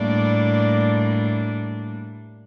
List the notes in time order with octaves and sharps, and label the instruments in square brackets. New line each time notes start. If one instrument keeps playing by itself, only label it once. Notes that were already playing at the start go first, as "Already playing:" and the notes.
Already playing: [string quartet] A2 G3 A#3 D4 D5